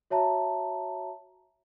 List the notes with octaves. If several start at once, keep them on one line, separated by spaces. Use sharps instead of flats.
F#4 C#5 E5 A5 A#5